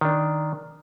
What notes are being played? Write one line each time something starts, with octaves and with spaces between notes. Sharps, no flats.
D#3 D4